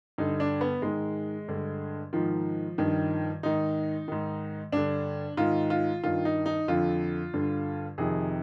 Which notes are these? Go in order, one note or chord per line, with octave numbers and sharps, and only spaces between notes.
G2 D3 D#4
D4
B3
G#2 D#3 G#3
G2 D3
G#2 D#3 F3
G2 D#3
G#2 D#3 D#4
G#2 D#3
G2 D3 D4
G#2 D#3 F4
F4
G2 D#3 F4
D#4
D#4
F2 D3 F4
G2 D3
F2 C3 D#3 G#4